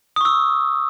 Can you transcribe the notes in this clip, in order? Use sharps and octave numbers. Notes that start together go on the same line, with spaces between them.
C#6 D#6 E6